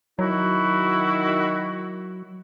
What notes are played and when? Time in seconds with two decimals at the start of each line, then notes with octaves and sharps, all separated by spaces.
0.19 D#3 F#3 E4 F#4